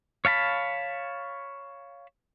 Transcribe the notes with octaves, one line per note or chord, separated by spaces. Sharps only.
C#5 F5 A5 B5